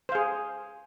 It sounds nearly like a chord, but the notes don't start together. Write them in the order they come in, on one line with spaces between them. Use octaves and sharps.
C5 F5 G#4